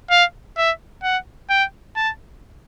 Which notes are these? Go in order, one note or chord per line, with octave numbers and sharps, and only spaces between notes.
F5
E5
F#5
G5
A5